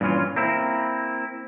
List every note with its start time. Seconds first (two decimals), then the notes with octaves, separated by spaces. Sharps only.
0.01 G2 A#2 E3 C#4 F4
0.36 A#3 C4 E4